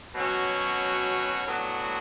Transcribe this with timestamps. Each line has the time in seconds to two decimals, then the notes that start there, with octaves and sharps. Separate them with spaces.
0.14 B2 F#3 C#4 F#4
1.46 A2 F#3 B3 D4 F#4